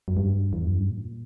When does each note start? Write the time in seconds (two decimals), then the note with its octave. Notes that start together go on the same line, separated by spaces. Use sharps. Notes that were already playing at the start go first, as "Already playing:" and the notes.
0.08 F#2
0.17 G2
0.53 E2
0.66 F#2
0.78 G2
0.91 A#2